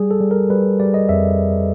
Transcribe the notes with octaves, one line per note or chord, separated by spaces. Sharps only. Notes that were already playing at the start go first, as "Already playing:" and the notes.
Already playing: G3 G#4
A4
G3
A#4
G3 B4
G3 D5
D#5
F2 E5